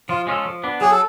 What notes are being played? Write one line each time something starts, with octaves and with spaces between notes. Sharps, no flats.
F3 F4
G#3 C#4 F4 A4
F3
B3 D4
F#3 G#4
A4